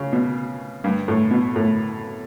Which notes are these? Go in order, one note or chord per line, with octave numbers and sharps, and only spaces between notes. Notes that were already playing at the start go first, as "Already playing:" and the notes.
Already playing: C#3
B2
G2
A2
B2
A2